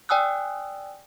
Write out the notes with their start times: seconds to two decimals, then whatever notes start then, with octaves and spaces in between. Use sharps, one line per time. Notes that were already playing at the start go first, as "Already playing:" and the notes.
0.09 D5 G5 G#5 D#6 E6 F#6